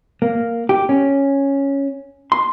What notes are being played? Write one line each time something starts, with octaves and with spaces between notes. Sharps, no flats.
A#3
G4
C#4
C6